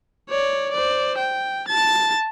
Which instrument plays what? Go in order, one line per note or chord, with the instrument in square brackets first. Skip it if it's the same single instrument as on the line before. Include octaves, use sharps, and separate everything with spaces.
[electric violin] C#5 D5
C5 D5
G5
A5 A6